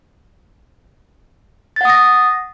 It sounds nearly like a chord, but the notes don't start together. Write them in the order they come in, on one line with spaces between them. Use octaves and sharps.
A6 F#5 D#6 A#6